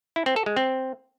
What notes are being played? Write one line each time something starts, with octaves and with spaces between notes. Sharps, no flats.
E4
C4
A4
G#3
C4